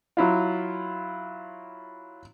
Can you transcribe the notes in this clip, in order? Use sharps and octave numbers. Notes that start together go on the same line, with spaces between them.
F#3 E4 F4